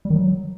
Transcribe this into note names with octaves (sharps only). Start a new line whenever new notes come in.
G3
D#3
F#3